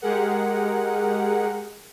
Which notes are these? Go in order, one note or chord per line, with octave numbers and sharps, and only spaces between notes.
G#3 G4 G#4 A#4 F#5